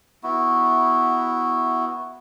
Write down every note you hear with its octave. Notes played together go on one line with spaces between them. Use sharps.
B3 E4 F#4